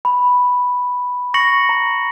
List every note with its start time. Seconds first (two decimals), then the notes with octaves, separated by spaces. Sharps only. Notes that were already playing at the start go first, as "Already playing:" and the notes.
0.05 B5
1.34 C#6 A#6 C#7 F#7
1.69 A#5